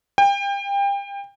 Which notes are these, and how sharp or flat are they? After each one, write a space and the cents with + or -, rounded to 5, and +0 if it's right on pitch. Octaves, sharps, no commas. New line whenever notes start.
G5 +30